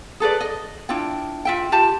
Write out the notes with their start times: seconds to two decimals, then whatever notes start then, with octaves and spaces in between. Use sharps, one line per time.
0.20 G#4 A4 B4 D5
0.40 D#5
0.89 D4 E4 F4 G5
1.45 F4 E5 G5
1.72 F4 G4 A5